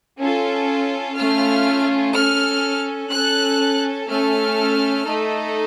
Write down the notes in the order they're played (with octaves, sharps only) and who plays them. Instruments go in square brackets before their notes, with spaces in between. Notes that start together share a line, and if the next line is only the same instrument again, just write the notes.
[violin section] C#4 F4 A4
A3 C#4 F4 F6
C#4 A4 F6
C#4 A4 F#6
A3 C#4 A4 F6
A3 D#4 A4